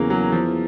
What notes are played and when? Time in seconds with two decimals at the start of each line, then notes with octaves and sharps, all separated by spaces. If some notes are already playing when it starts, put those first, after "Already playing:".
Already playing: E2 C#3 F#3 A#3 C#4
0.10 F#3
0.32 F3